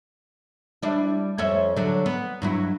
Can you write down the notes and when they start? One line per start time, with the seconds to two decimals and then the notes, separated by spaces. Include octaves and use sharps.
0.82 G3 D4 E4
1.38 F2 C#4 E5
1.76 D3 F#3
2.06 B3
2.42 G2 F#3 E4